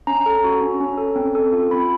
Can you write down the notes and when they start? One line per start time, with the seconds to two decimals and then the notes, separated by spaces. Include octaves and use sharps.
0.07 C#4 A#5
0.26 A4
0.44 F#4
0.62 C#4
0.80 C#4
0.97 A4
1.16 C4
1.35 A4
1.53 F4
1.70 C4 B5